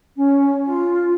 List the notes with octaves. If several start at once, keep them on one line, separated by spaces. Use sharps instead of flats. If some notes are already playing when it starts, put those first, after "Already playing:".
C#4
F4